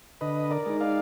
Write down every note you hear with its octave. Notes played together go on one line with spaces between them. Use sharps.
D3 B4 D#5
A#4 D5
G#3 D#4
D5 F5